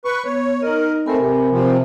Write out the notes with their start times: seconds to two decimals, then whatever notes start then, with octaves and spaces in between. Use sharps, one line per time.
0.05 B4 C#6
0.25 B3 C#5
0.62 D#4 A#4 D#5
1.06 A3 C4 A#4 G#5 B5
1.18 C3
1.51 C3 F3